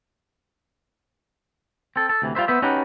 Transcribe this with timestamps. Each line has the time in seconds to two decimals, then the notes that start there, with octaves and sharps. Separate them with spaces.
1.96 C4 A4
2.09 A4
2.22 D2 C3 E3
2.35 G3 F4 B4 C5 E5
2.48 B3 B4 C5 E5
2.62 C#4 D#4 F#4 G4 B4